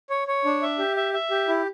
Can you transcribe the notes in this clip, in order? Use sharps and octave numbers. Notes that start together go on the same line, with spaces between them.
C#5
C#5
D4
E5
G4
E5
E5
G4
E4